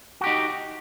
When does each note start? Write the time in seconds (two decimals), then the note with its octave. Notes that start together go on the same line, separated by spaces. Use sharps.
0.21 F#4
0.24 G4
0.27 D#4